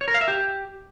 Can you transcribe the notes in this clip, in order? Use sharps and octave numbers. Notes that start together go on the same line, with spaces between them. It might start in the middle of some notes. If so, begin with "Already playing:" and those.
C#5
A#4
F5
E5
G4